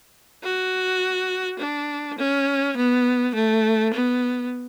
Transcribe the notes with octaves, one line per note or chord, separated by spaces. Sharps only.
F#4
D4
C#4
B3
A3
B3